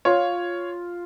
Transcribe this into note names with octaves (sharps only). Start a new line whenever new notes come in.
F4 C#5